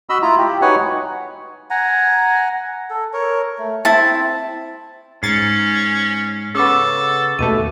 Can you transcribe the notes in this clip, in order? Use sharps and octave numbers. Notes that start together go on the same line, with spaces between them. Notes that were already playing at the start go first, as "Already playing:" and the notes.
F#4 D#5 B5 E6
E4 F4 A#5
G4
D#4 F#4 B4 C#5 F#5 G#5
F#5 G#5 A#5
A4
A#4 C#5
A3
C4 E4 A5
G#2 C#4 A6 C7 C#7
C#3 B3 A4 C#6 D6 E6
D#2 B2 A3 D#7